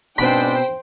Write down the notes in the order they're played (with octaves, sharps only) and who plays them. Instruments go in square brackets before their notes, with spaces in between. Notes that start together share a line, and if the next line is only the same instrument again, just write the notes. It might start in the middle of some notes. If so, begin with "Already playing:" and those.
[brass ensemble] G#2 D4 B4 [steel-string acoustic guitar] B2 C4 [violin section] C5 G5 [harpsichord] B5